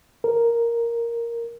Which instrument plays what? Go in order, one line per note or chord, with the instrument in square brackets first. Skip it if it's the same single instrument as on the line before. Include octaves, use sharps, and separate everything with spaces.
[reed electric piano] A#4